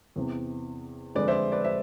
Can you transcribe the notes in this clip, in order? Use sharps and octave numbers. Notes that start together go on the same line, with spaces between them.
E2 C3 E3
F2 D3 G#3 B4 D5
C5 E5
B4 D5
C5 E5